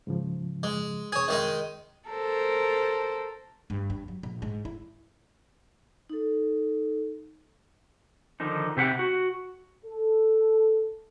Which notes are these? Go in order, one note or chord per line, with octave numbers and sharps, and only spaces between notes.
G#2 C#3 F3
G#3
C3 G#4 C#5 G#6
D#3 G#3 D#4
A4 A#4 C5
G2
G2
F#3
A#1
G#2
E4
D#4 A4
D3 D#3 F3 D#4
C3 G4 C5 F#5
F#4
A4